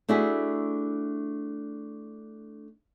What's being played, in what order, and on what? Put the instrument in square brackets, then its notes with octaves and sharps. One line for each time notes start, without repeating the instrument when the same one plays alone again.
[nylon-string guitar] A3 D4 E4 F#4 G#4